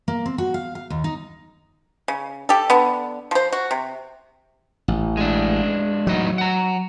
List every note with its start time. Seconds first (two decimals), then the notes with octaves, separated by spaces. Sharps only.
0.08 A#3
0.26 C4
0.38 F#4
0.54 F5
0.75 F5
0.90 D#2
1.04 D#4
2.08 C#3
2.49 G4 A4
2.70 D3 B3
3.31 F3 C5
3.52 F#4
3.71 C3
4.88 A1
5.17 G#3 D4
6.07 E2 A2 F#3 D#4
6.38 F#5 A#5